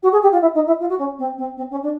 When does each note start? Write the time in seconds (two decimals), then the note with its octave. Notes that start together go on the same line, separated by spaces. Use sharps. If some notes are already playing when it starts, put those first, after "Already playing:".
0.03 F#4
0.12 G#4
0.22 G4
0.32 F4
0.41 E4
0.54 D#4
0.67 E4
0.80 F4
0.89 F#4
0.99 C#4
1.18 C4
1.37 C4
1.57 C4
1.70 C#4
1.82 D4